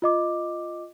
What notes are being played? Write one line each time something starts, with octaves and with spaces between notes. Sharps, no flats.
F4 D#5 D6